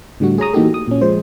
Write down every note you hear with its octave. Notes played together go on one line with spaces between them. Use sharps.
A2 D3 G3 A3 F#4
G#4 C#5 A#5 D#6
E3 A#3 D#4 F#4 G4 A4
D#6
A#2 C#4
F3 G#3 C5